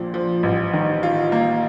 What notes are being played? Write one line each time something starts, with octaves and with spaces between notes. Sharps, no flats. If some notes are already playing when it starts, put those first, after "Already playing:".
Already playing: A#1 A#2 F3
F3
A1
D#3
F4
A#3